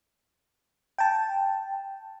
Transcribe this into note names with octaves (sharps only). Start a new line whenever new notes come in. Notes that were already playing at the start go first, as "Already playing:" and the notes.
G5 A5